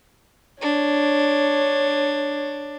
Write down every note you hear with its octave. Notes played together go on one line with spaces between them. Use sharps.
D4 C#5